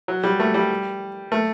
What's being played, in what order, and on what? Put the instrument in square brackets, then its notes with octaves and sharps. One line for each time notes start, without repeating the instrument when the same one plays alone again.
[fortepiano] F#3
G3
A3
G3
A3